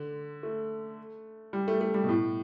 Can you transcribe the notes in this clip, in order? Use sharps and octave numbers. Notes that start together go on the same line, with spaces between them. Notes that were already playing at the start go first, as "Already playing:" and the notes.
Already playing: D3
A3
G3
A3
A3
G3
B2
A2